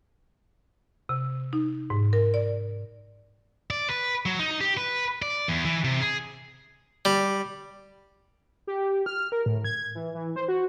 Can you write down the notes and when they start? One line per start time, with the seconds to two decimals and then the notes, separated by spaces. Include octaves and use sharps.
1.09 C3
1.53 D#4
1.90 G#2
2.13 A#4
2.34 D5
3.70 D5
3.90 B4
4.26 F#3
4.39 D#4
4.61 G4
4.77 B4
5.22 D5
5.48 E2
5.65 E3
5.84 C3
6.01 G#4
7.05 G3
8.67 G4
9.06 F6
9.32 A#4
9.46 A2
9.65 G#6
9.95 E3
10.15 E3
10.36 C5
10.48 F#4